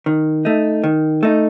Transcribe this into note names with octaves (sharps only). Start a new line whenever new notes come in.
D#3
A3 D#4
D#3
A3 D#4